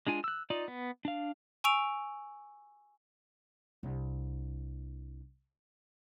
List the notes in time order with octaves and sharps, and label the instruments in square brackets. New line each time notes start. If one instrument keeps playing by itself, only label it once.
[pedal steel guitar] G#3 D4 F4 G#5
E6 F#6
D#4 F4 D5
B3
D4 F5
[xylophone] G#5 C#6 E6 D7 F7
[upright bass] C2 D4